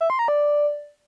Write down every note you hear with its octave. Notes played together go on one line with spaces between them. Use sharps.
E5
C6
A#5
D5